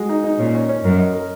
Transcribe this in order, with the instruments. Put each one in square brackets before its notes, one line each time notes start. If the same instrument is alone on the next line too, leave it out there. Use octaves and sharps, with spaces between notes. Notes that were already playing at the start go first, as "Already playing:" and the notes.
Already playing: [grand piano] G#3 F#4
D#4
D#4
[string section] A#2 [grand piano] C#4
[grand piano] C#4
C#4
[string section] F#2 [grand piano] A#4
[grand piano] D#5
A#4